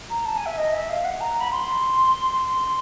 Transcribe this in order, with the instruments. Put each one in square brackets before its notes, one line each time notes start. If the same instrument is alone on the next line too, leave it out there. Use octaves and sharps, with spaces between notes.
[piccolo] A#5
A5
G#5
E5
D#5
E5
F5
F#5
A#5
B5
C6
C6